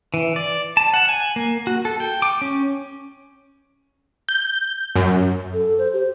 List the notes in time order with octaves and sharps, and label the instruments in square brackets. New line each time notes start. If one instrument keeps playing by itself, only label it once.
[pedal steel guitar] E3
D5
A5
F#5
G#5
A#3
F#4
A4
G5
D6
C#4
[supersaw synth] G6
F#2
[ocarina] A4
C5
G4